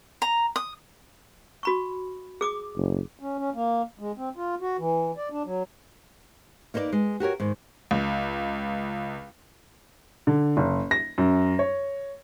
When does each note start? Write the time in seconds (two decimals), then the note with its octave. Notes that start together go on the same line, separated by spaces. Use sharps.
0.22 A#5
0.56 D#6
1.63 F#4 B5 C#6
2.41 G#4 D6 D#6
2.76 F#1
3.19 C#4
3.38 C#4
3.54 A#3
3.99 G#3
4.17 C4
4.37 F4
4.61 F#4
4.79 E3
5.17 D5
5.31 D4
5.45 F#3
6.74 A#3 D#4 B4 C5 D5
6.92 G#3
7.20 F#4 G4 A#4 C#5
7.40 G#2 D#3
7.91 C#2
10.27 D3
10.57 F#1
10.91 A#6
11.18 F#2
11.59 C#5